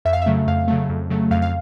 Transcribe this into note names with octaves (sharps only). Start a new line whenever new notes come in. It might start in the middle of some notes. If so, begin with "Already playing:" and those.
F2 E5
F5
E5
C#3 F#3 A3
F2 F5
C#3 F#3 A3
F2
C#3 F#3 A3
F2 F5
F5